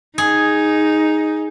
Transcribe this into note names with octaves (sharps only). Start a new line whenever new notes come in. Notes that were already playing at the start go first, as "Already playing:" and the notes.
D#4 G#4